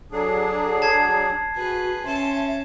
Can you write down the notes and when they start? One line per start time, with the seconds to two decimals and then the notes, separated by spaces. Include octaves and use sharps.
0.12 F#3 D4 G#4 A4
0.82 A5 G#6 C7
1.56 F#4 G#4 B4
2.05 C#4 E5 A5 C6